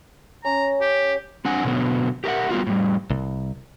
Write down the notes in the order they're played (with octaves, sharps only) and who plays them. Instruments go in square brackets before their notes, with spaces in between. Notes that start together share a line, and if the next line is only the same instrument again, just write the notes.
[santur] C#4 [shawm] A#5
[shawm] G4
[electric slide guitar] C4 D4 F#5 G#5
B2 D3 F#3 B3
G4 A#4 E5 F#5
G3 B3 F4 F#4
A2 G3
[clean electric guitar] C2